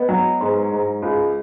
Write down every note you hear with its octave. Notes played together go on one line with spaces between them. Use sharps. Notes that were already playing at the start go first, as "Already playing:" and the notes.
Already playing: B3 D#5
F#3
G#2
G#2
C#2